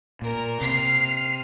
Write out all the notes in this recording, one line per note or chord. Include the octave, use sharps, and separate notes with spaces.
A#2 A#4
C3 F6 C7